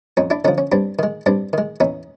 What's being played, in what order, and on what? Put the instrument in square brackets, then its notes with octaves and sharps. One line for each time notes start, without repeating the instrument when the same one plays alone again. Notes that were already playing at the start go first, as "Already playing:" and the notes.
[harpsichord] F2 C#4 D#4
D4 E4
D3 F3 C#4 D#4
C#4
G2 C4 D4
D#3 G#3
G2 C4 D4
D#3 G#3
E2 C#4 D#4